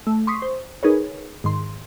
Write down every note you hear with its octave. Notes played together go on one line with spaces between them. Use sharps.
A3
C6 C#6 D#6 B6 C7
C5
D#4 G#4 A#4 B4 C#5
G#2 D#3 C6